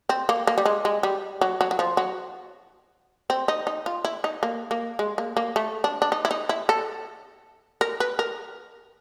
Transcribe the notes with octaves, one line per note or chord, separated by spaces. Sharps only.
C4
A#3
A#3
G3
G#3
G#3
G3
F#3
F#3
F#3
F3
F#3
C4
D#4
D#4
F4
E4
D#4
A#3
A#3
G#3
A#3
A#3
A3
D4
D4
D#4
E4
D#4
E4
A4
A#4
B4
A#4